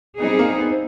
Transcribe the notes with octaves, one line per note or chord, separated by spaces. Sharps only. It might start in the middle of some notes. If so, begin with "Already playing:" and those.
G3 B3 C4 D#4 G#4
A#3
B3
C4